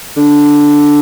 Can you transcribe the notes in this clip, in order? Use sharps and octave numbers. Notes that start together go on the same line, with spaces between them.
D3